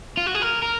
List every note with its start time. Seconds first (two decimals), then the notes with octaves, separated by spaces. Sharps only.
0.17 F4
0.26 F#4
0.35 G#4
0.42 A#4
0.62 A#4